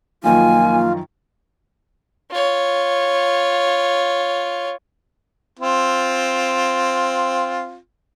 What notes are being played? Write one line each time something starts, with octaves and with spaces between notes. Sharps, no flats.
F#2 D#3 F3 A#3 F4 G#5
F4 C#5
C4 F4